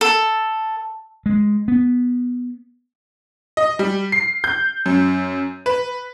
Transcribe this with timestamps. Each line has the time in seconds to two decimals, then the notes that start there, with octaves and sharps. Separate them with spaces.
0.01 A4
1.26 G#3
1.68 B3
3.57 D#5
3.79 G3
4.12 C7
4.44 G6
4.86 F#2
5.66 B4